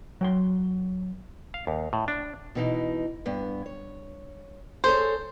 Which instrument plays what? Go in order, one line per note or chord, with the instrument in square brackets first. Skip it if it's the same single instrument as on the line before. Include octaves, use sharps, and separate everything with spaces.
[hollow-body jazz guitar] F#3 G5 C6
[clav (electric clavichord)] F5
D#2
A2
D4
[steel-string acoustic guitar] B2 E3 D#4
G2 B3
C#5
[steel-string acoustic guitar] G#4 A4 C#5 [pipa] C5